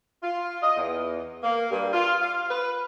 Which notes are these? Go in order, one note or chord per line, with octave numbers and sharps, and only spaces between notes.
F4
D#5
E2
A#3
G2
F4
F5
B4